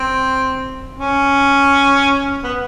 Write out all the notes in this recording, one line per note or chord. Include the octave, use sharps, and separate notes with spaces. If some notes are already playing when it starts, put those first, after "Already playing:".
Already playing: C4
C#4
B3